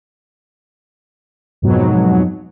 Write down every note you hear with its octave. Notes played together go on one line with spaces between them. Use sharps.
F2 G#2 B2 F#3